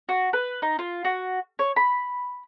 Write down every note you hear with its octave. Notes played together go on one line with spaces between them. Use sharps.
F#4
B4
D#4
F4
F#4
C#5
B5